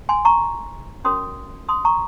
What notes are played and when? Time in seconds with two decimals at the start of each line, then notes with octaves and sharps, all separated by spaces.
0.09 G#5 C6
0.25 A#5 C#6
1.05 C#4 F#4 A#4 C#5 C6 D#6
1.69 C6 D#6
1.85 A#5 C#6